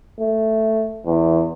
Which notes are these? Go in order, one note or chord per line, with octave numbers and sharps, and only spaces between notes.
A3
E2